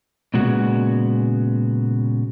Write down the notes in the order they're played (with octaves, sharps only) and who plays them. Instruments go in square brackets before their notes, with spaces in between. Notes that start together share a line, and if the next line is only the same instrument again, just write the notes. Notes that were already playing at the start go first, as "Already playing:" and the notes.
[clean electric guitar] A#2 C#3 G#3 B3 F#4